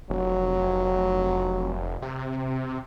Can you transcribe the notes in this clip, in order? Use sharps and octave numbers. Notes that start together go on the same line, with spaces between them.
F1 F#3
C3